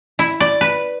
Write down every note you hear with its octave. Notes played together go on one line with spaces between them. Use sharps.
E4
D5
B4